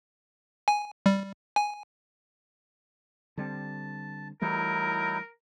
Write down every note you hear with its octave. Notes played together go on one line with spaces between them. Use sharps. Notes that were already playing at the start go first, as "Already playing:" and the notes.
G#5
G3
G#5
D3 G3 C4 A5
E3 F#3 G3 A3 D#4 E4 A#4